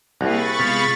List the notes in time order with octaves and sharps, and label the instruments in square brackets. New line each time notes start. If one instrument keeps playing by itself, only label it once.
[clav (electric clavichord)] C2 [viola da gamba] A#3 C4 G#4 [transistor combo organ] F#4 [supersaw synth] B5 C#6 A6
[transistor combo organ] C3 B3 F5 [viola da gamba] G#3 F4 G#4